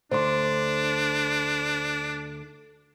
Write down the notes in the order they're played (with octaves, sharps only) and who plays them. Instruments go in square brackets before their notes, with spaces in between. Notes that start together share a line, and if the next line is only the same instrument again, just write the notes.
[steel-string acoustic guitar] D2 D3 [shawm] D4 [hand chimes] C5 C6